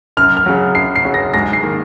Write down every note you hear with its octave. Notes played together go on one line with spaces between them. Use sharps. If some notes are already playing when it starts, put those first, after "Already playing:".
F#2 F6
F6
C#3 F#3
F#2 C7
C7
C#3 F#3
A#6
G#2 A#6
C7
D#3 A#3